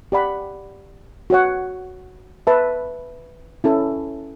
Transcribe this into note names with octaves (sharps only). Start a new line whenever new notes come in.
G4 D5 F#5 B5
F#4 C#5 F#5
B4 E5 A5
C#4 E4 A4